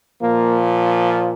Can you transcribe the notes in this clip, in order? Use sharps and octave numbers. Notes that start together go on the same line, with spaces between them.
A#2 F3 A#3